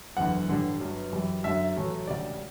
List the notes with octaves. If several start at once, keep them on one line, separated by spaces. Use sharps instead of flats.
F#1 E2 D3 F#5
A1 G2 D3 G3
G1 G2 F#3
F#2 E3 G3
F#2 D3 F#3 E5
A1 A2 F#3 A3
E1 D2 C#3 G3 D5